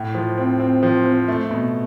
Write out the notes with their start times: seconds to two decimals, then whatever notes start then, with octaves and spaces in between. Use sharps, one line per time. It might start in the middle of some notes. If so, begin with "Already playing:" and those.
Already playing: A2
0.15 F3
0.38 C4
0.60 C4
0.83 F3
1.06 C4
1.28 A3
1.51 B2